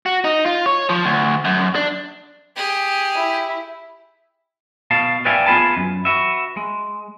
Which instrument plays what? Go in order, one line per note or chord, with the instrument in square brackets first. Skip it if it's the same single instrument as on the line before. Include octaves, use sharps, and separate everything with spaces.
[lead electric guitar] F#4
D#4
F4
C#5
F3
D2
F#2
D4
[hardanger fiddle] G4 G#4
[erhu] E4
[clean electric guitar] B2 F5 A5
B4 D5 E5 F5 G5 G#5
B3 F4 G#4 B4 A5
F#2
F#4 B4 E5
G#3